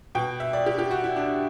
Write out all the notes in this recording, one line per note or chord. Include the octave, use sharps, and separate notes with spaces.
B2 G5
E5
D5
G4
G4
F#4
E4
D4